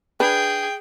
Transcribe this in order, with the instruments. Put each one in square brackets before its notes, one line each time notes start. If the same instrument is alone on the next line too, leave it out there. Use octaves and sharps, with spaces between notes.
[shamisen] D4 B4 [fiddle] G#4 [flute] G5